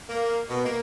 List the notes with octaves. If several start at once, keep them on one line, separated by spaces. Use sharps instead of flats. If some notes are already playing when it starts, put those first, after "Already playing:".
A#3
B2
A#3